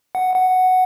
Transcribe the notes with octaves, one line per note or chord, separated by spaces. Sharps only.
F#5
F#5